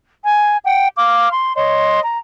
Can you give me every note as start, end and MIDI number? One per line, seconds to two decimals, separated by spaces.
0.23 0.56 80
0.65 0.87 78
0.65 0.87 79
0.97 1.29 77
0.97 1.29 86
0.97 1.29 89
1.29 1.52 84
1.56 2.00 73
1.56 2.00 75
1.56 2.00 84
2.03 2.18 82